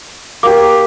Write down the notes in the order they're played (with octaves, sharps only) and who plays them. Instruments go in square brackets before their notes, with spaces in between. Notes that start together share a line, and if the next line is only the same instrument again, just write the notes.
[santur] A#3 G4 [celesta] D6